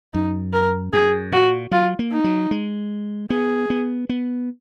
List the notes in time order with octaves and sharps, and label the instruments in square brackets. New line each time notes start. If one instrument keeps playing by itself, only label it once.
[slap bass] F#2 [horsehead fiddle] D#4
[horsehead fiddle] A#4
[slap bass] F#2 [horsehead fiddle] G#4
[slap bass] A#2 [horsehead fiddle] F#4
[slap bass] F#3 [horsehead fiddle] F4
[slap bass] A#3
[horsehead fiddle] D#4
[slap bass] F#3
G#3
[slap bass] B3 [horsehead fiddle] G#4
[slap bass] B3
B3